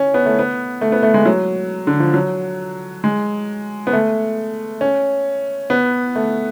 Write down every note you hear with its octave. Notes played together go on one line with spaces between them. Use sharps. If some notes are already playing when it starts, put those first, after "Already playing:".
Already playing: C#4
B3
A3
B3
A3
B3
A3
G#3
F#3
D3
F3
F#3
G#3
B3
A3
C#4
B3
A3